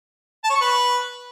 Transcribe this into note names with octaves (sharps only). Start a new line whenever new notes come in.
A5
C#5
C#6
B4